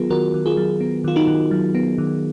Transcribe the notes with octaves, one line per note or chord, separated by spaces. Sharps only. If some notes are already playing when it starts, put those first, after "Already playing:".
Already playing: D#3 F#3 B3 F4 G#4 A#4
D#3 F#4 A#4
D#3
F4 G#4
F#3
B3
D#3 F4
D#4 F#4
D#3
F#3
B3
D#3